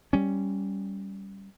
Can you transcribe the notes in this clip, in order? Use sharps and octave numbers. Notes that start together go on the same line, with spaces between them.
G3 C#4